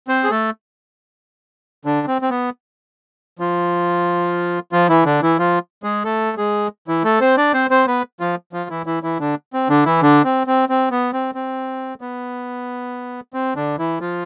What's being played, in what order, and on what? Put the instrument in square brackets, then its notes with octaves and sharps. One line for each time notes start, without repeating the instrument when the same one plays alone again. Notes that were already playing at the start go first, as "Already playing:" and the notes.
[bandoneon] C4 C5
G#4
A3 A4
D3 D4
C4
C4
B3
F3 F4
F3 F4
E3 E4
D3 D4
E3 E4
F3 F4
G#3 G#4
A3 A4
G#3 G#4
E3 E4
A3 A4
C4 C5
D4 D5
C4 C5
C4 C5
B3 B4
F3 F4
F3 F4
E3 E4
E3 E4
E3 E4
D3 D4
C4
D3 D4
E3 E4
D3 D4
C4
C4
C4
B3
C4
C4
B3
C4
D3 D4
E3 E4
F3 F4